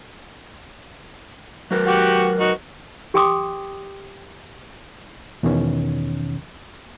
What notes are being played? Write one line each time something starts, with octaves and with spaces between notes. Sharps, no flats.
F#3 A#4 B4
F#4 G4 F#5
D#4 F#4
G4 G5 G#5 C6 D6 D#6
E2 B2 D#3 C#4